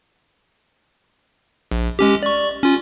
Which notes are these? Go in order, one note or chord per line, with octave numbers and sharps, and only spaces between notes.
A#1
G#3 C#4 G4
D5 C#6
C#4 F4